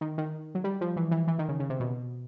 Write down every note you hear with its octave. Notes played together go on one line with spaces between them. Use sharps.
D#3
D#3
F#3
G3
F3
E3
E3
E3
D#3
C#3
C#3
C3
B2